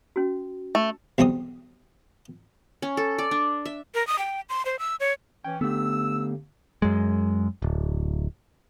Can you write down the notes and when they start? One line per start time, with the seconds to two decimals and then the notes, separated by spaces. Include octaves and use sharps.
0.16 C#4 F#4
0.75 A3
1.18 B1 E2 G3 C4 D#6
2.82 C#4
2.97 A4
3.18 D5
3.31 D4
3.65 E5
3.95 A#4
4.07 D#6
4.19 G5
4.49 C6
4.65 C5
4.79 E6
5.00 C#5
5.45 E3 C#4 G5
5.61 D3 A3 B3 G4 E6
6.82 F#2 G#3
7.62 D1